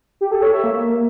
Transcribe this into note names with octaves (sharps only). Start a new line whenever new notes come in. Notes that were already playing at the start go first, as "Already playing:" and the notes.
G4
A4
C#5
E5
A#3